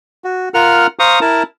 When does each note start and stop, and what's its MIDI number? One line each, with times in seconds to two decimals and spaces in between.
0.24 0.49 66
0.54 0.87 65
0.54 0.87 70
0.54 0.87 78
0.54 0.87 89
0.99 1.19 72
0.99 1.19 77
0.99 1.19 82
0.99 1.19 85
0.99 1.19 87
1.21 1.43 64
1.21 1.43 70
1.21 1.43 81